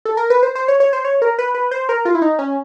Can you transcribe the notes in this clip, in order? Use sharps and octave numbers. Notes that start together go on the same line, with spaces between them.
A4
A#4
B4
C5
C5
C#5
C#5
C5
C#5
A#4
B4
B4
C5
A#4
F4
E4
D#4
C#4